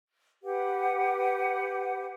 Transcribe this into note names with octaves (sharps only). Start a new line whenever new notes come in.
G4 B4 F#5